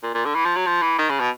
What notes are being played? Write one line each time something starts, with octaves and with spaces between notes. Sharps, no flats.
A#2
A#2
D3
E3
F3
F#3
F3
E3
D#3
C#3
B2